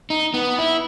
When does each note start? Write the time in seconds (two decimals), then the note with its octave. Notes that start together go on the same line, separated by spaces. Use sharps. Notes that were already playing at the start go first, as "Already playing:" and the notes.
0.10 D#4
0.34 B3
0.59 E4